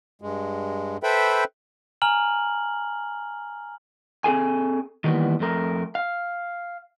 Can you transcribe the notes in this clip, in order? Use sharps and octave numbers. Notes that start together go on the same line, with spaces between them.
G2 G#3
A4 B4 C5 E5 G5 B5
G#5 A#5 F6 F#7
C4 G#4 A4 G#5
D#3 E3 G3 A#3 B3
F2 A3 A#4
F5